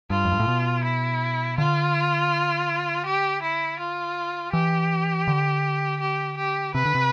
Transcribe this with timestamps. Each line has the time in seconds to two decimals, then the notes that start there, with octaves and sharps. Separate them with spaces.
0.10 G2 F4
0.25 F2
0.32 G2
0.40 A2
0.48 B2
0.84 E4
1.58 D3 F4
3.06 G4
3.42 E4
3.79 F4
4.53 E3 G4
5.27 D3
6.00 G4
6.37 G4
6.75 C3 B4
6.85 D3
6.95 C3